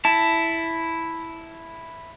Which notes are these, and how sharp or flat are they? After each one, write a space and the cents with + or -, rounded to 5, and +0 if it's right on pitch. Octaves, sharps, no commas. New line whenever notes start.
E4 +0 A5 +0